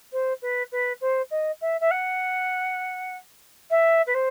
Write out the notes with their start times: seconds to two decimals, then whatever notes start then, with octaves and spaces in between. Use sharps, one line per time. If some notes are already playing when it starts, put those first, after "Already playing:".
0.12 C5
0.42 B4
0.72 B4
1.01 C5
1.31 D#5
1.61 E5
1.80 E5
1.91 F#5
3.70 E5
4.06 B4
4.14 C5